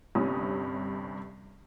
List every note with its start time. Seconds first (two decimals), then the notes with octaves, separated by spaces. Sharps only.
0.15 G1 G2 C3 C#4 D#6